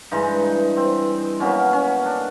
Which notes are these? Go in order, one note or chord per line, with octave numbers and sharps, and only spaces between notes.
G2 E3 G#3 D#4
C4
B2 F#3 A#3 C#4
C#4
D4